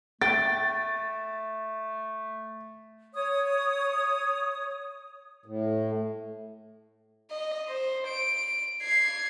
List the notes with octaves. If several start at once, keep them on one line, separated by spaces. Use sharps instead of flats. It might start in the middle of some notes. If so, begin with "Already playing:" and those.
A3 G5 A6
C#5 D#6
A2
D#5
C5
D7
G#6 C7